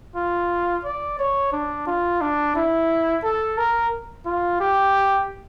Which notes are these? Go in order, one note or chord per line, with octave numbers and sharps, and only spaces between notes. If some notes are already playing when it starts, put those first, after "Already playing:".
F4
D5
C#5
D4
F4
D4
E4
A4
A#4
F4
G4